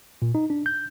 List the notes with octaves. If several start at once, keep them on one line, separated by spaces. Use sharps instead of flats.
A#2
D#4
D4
G6